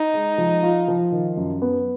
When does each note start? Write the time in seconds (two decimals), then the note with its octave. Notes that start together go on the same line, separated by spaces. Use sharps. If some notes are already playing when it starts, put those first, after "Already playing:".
Already playing: D#4
0.14 G#3
0.38 F3
0.63 F4
0.88 F3
1.12 D#3
1.37 F#2
1.62 B3